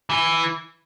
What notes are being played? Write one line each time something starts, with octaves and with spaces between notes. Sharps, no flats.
E3